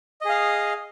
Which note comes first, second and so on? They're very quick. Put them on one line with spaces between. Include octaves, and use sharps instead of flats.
D#5 G#4 F5